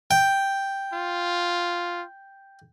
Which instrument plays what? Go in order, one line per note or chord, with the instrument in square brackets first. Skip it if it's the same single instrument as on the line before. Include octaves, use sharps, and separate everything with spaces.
[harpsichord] G5
[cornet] F4